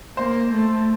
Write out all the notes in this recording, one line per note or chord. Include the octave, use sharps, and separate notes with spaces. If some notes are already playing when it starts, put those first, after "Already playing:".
A#3 C5
A3